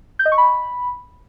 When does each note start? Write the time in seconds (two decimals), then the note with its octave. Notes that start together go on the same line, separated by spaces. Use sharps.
0.19 G6
0.25 D#5
0.32 C#6
0.38 B5